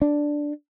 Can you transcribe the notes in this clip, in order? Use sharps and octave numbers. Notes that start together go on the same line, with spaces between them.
D4